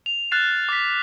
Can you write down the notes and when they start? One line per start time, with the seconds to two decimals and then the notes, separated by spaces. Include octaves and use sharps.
0.06 F7
0.31 F6 F#6 A6 C7 E7
0.69 D6 B6